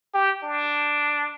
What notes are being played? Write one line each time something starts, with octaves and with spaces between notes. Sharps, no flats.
G4
D4